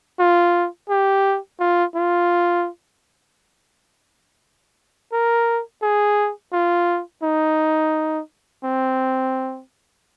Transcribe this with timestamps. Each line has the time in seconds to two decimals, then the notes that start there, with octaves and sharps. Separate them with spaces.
0.19 F4
0.89 G4
1.60 F4
1.95 F4
5.13 A#4
5.82 G#4
6.53 F4
7.23 D#4
8.64 C4